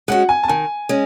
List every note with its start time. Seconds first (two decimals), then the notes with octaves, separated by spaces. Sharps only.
0.08 G#3 C#4 F#4 F#5
0.29 G#5
0.43 A5
0.48 D#3 G#5
0.89 G#3 C#4